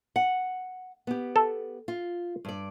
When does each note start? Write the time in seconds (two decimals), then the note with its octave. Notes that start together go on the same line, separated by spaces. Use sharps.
0.16 F#5
1.07 B3 G4
1.36 A4
1.88 F4
2.45 G2 D5